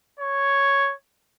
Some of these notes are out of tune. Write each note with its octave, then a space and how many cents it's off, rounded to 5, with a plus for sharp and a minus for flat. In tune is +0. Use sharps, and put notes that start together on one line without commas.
C#5 +0